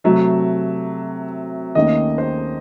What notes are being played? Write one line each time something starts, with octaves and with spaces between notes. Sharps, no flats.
C3 F#3 A3 E5
D#2 D#3 A3 C#4 D#5
C5